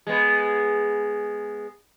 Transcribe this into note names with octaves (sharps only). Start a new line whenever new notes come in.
G#3 B3